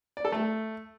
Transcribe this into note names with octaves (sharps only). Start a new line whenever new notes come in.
D5
A4
A3